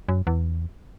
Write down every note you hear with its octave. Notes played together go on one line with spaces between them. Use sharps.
F#2
E2